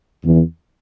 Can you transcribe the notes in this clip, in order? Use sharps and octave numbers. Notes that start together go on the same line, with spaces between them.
E2